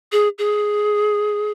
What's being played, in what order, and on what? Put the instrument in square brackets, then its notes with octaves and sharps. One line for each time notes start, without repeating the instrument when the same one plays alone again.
[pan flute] G#4
G#4